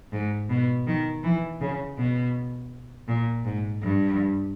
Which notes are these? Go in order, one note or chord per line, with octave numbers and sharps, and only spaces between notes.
G#2
B2
D#3
E3
C#3
B2
A#2
G#2
G2